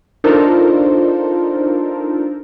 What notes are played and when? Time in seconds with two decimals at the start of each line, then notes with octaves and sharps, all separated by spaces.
0.24 D4 D#4 F4 A4 A#4 C5